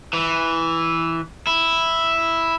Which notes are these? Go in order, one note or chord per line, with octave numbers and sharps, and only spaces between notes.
E3
E4